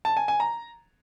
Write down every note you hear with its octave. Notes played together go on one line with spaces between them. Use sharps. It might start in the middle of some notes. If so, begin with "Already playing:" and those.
A5
G#5
G#5
A#5